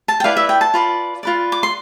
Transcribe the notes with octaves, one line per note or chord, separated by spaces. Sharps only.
A5
G5
E4 B4 D5 F5
E5
G5
A5
F4 B4 D5
F4 B4 D5
D6
C6